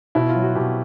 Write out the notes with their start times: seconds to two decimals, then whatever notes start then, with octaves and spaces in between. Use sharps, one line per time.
0.15 B2 E4
0.29 F4
0.35 F#3
0.42 F#4
0.55 B2 G4